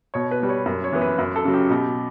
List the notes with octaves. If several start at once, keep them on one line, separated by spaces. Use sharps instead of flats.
B2 C#5
B4
G3 B3
C#5
F#2
C#5
E3 B3
B4
F#2
A4
C#3 F#3
G4
B2 G4